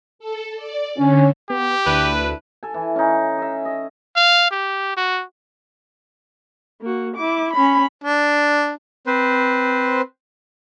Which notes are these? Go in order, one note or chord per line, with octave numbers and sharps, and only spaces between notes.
A4
D5
D3 C#4
B3 G4
D2 D4 E4 B4
A4 G#5
E3
C#4 D#4
D#5 E5
D#5
F5
G4
F#4
A#3 F#4
E4 D6
C#4 B5
D4
C4 B4 C5